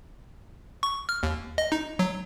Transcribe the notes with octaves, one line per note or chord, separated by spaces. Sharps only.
C#6
F6
D#2
D#5
D#4
F#3